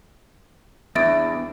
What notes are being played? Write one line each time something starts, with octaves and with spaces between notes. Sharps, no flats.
E2 B3 D4 E5 A6 D7